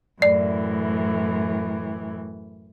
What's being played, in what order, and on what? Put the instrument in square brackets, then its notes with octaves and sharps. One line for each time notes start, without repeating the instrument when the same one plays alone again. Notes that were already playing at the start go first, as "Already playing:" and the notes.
[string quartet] F#2 A2 E3 [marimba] D5